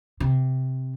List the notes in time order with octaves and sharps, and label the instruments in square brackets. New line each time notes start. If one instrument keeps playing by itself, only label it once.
[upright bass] C3